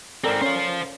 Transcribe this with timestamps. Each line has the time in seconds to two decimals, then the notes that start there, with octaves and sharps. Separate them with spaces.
0.24 G#2 C4 A4 A#4 D5
0.41 C#4 C5 F5